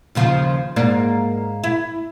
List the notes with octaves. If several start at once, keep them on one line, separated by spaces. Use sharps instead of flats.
D#2 C#3 F3
G#2 A#3 D5
E4